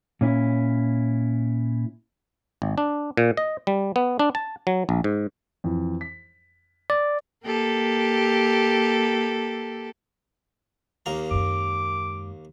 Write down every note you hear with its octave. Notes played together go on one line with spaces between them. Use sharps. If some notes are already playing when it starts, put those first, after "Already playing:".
A#2 C#4 E4
G#1
D4
A#2
D#5
G3
B3
D4
A5
F#3
A#1
G#2
F2 E3
B6
D5
A#3 G4 A4
D#2 A#3 A#5
F#2 G#3 D6